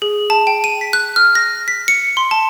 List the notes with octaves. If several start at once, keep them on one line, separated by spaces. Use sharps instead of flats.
G#4
A5
G5
D#7
B6
F#6
F6
A#6
B6
C#7
C6
A5